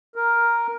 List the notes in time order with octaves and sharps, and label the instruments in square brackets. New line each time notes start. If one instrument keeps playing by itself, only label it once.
[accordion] A#4